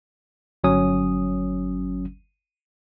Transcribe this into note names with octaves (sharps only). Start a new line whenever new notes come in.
G1 F#3 C#4 D#6